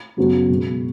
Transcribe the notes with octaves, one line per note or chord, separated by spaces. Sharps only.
F#2 C#3 F#3 B3 F#4
B2 G#3 B3